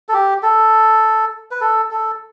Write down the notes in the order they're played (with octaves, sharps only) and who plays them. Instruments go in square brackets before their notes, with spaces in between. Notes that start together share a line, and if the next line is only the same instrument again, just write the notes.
[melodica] A4
G4
A4
B4
A4
A4